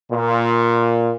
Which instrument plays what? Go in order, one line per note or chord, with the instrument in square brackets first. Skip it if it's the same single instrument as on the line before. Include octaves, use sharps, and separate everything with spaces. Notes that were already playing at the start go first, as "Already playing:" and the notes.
[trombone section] A#2